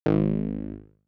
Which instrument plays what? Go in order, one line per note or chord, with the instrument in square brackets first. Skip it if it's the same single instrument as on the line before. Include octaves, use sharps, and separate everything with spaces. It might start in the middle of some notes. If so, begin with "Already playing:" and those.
[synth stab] G#1